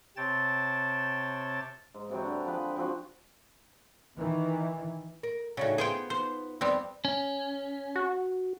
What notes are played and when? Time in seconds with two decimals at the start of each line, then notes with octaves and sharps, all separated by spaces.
0.17 C3 C4 C#5 G5 A5 A6
1.94 G#2
2.10 C3 E3 F#3 G5
2.24 D3
2.45 F3 G#4 B4 G5
2.76 F3 C4 F#4
4.18 D#3 E3
5.23 A#4
5.57 A2 C#3 F#3 D4 D#4
5.78 B3 D#4 F4 G#4 C5 G5
6.10 C5
6.61 F2 G3 B3 C4
7.05 C#4
7.96 F#4